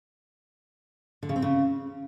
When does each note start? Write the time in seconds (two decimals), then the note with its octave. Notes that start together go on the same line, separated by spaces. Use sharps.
1.23 D3
1.29 C#3
1.36 C4
1.42 C#3